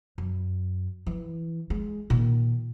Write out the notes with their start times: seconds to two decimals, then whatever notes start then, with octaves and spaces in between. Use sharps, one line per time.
0.18 F#2
1.07 E3
1.70 G#3
2.10 A#2 D#3